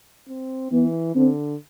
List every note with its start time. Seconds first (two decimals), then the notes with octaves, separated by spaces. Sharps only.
0.28 C4
0.72 E3 B3
1.16 D3 C4